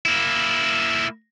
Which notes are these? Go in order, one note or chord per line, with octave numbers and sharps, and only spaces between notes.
A#3 E4